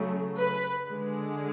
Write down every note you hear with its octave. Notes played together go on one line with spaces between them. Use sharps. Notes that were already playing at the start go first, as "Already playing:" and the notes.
Already playing: C#3 F#3 A3
B4
D3 G#3